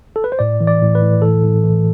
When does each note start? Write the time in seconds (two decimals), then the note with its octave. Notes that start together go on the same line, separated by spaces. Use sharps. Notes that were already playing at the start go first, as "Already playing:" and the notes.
0.16 A4
0.24 B4
0.32 C5
0.39 A2 D5
0.61 E3
0.67 D5
0.81 A2
0.95 B4
1.02 A2
1.22 E3 A4
1.44 A2
1.64 E3